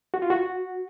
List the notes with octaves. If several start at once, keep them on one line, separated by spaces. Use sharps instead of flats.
F#4
F4
F#4